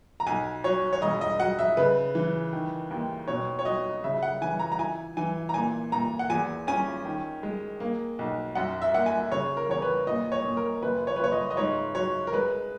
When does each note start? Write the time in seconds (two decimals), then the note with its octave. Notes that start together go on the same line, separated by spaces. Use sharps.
0.20 A#5
0.27 B1 G#5
0.64 F#3 C#5
0.93 C#5
1.02 E1 D#5
1.21 D#5
1.40 F#3 F#5
1.59 E5
1.77 C#3 B4
2.15 E3
2.53 D#3
2.91 D#2
3.28 B2 C#5
3.59 C#5
3.65 F#3 D#5
4.04 C#3 E5
4.23 F#5
4.41 E3 G#5
4.59 A#5
4.72 A#5
4.79 E4 G#5
5.17 E3 G#5
5.49 A#5
5.54 A#2 G#5
5.92 A#2 A#5
6.19 F#5
6.30 E2 G#5
6.67 C#4 G#5
7.05 D#3
7.43 G#3
7.80 A#3
8.19 B1
8.55 F#2 F#5
8.82 E5
8.94 A#3 F#5
9.06 G#5
9.32 C#3 C#5
9.57 A#4
9.69 E2 C#5
9.82 B4
10.07 A#2 D#5
10.32 C#5
10.44 A#2
10.57 A#4
10.82 F#1 B4
11.07 C#5
11.16 B4
11.20 F#1 C#5
11.32 D#5
11.51 D#5
11.57 G#2 C#5
11.95 F#3 C#5
12.27 A#4
12.32 G#3 B4